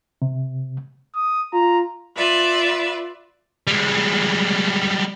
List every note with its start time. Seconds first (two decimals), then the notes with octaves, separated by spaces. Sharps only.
0.22 C3
1.15 D#6
1.53 F4 A#5
2.17 F4 B4 D5 E5
3.67 G3 G#3